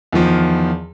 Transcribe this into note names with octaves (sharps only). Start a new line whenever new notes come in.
E2 D#3 F3